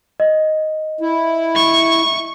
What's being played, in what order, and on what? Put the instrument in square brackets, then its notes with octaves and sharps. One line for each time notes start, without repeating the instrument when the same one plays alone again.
[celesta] D#5
[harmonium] E4
[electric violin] C#6